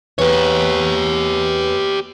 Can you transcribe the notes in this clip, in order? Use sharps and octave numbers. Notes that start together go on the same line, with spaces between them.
E2 G4 C#5